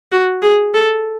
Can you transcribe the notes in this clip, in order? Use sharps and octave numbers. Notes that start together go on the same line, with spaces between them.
F#4
G#4
A4